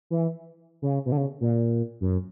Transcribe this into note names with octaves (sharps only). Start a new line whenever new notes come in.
E3
C#3
B2
D3
C#3
A#2
F#2